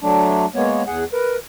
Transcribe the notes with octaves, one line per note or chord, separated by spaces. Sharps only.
F#3 A3 D4
G#3 A#3 B3 C#5
E2 G#4 F#5
A#4 B4